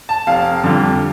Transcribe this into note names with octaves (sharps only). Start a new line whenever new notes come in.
A5
F1 F5
F2 D3 G3